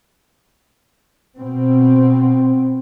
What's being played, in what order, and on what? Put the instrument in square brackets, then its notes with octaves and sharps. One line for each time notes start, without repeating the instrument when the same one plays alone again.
[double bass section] B2 C4